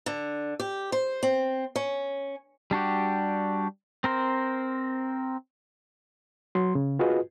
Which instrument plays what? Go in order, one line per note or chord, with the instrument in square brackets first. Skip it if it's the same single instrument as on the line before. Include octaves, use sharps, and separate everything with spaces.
[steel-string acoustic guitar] D3
G4
C5
C4
C#4
[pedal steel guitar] G3 D4 F#4 G4
C4 A#4 C5
[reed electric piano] F#3 C6
C#3
F4 F#4 G#4 B4 D#5